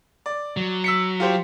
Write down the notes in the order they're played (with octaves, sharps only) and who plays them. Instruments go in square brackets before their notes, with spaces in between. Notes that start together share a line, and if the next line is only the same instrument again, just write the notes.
[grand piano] D5
[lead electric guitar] F#3
[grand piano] E6 B6 C#7
F4 G4 C5